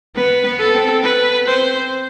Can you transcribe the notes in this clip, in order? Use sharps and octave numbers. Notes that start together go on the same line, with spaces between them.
B3 B4
B3
A4
C4
B3 B4
C4 C5